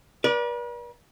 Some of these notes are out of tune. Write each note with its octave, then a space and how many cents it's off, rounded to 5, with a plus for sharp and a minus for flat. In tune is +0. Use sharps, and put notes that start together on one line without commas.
B4 -45 D5 -5